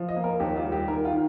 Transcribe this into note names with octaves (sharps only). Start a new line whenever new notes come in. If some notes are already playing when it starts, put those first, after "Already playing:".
Already playing: F3
D#5
A#3
A#4
D#2 G4
F4
G3
G4
D#3 A#4
F4
D#3